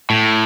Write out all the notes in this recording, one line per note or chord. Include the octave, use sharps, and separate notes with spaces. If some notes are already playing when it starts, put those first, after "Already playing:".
A2